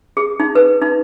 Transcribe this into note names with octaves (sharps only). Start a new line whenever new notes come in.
G#4
D#4
B4
D#4